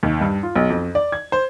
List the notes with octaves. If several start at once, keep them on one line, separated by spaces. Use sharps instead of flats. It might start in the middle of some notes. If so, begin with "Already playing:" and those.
D#2
G2
F4
B1
F2
D5
G#6
C5